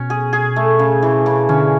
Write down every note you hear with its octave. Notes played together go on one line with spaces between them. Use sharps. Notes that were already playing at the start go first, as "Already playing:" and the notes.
Already playing: B2 C#4
G#4
G#4
A3
C#3
E3
C#3
D3 C#4